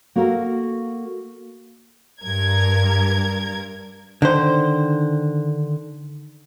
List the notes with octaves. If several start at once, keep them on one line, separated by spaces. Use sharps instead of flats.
A#3 F#4 A4 A#4 F5
G2 A#4 G#6
D3 D#3 C5